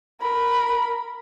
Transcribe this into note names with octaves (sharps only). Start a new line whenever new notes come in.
A#4 B5